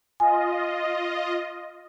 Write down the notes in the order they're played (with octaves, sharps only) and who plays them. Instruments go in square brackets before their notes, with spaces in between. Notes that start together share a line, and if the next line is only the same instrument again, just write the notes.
[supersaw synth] F4 D#5 [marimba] G#5